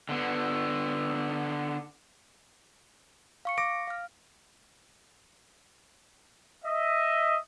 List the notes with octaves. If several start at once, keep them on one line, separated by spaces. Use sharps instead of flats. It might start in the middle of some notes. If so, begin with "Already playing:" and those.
D3 B3
F5 C#6 C#7
D6 A#6 D7
F5 F6
D#5 E5